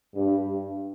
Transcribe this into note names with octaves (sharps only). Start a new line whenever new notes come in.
G2